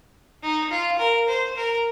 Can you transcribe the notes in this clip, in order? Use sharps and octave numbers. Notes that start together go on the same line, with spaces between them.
D#4
F4
A#4
C5
A#4